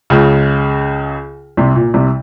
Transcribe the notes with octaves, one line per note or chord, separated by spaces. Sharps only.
C#2 C#3
C2 C3
A#2
C2 C3